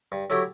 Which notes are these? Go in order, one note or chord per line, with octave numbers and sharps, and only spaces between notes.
G2
F#3 A3 E4 G4